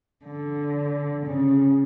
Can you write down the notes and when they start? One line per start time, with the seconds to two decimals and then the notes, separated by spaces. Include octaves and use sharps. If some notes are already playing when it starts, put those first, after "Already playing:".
0.24 D3
1.26 C#3